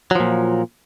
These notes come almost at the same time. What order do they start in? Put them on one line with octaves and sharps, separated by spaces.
F#3 F3 A#2